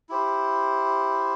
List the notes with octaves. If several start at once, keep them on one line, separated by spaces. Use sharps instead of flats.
E4 G4 C5